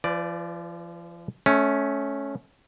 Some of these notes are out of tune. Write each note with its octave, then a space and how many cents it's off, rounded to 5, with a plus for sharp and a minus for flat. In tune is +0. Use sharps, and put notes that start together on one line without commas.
F3 -35 B4 +20 D5 +0
A3 -20 C#4 +0